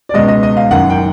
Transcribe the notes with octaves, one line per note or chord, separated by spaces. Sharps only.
D5
C#2 B2 G#3 D#5
D#5
D#5
F5
F#1 F#2 D#3 F#5
G5